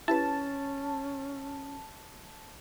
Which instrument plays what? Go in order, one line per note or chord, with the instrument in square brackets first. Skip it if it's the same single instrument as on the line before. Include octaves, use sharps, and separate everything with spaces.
[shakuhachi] C#4 [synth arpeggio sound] E4 G4 B4 [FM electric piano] A5